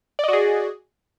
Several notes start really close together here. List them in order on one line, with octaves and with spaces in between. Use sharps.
D5 D#5 F#4 G#4